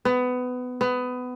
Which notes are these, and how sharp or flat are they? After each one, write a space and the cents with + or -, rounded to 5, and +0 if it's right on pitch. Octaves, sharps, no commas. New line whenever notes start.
B3 +20
B3 +20